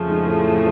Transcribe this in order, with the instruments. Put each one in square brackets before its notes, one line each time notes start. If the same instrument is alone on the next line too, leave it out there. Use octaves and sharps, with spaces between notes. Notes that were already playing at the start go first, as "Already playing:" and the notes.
Already playing: [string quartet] F2 C#3 F3 A3
[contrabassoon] G#2
A2